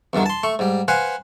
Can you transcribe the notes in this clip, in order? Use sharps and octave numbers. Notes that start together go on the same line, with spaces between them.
E2 G2 D3 D#3
A5 C6
A3 C#6
G#2 G3
B4 C5 F5 F#5 G#5